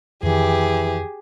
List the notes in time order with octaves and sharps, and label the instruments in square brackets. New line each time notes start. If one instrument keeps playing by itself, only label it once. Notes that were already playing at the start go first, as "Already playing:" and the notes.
[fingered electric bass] F2 D#3 [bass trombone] E3 [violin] G4 G#4